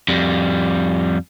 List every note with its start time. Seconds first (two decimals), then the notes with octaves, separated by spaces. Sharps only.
0.08 F2 G3